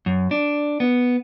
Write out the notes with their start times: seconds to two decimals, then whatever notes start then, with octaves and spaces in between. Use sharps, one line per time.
0.06 F#2
0.31 D4
0.80 B3